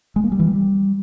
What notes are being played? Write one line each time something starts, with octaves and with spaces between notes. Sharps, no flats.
G#3
A#3
G3
E3
G3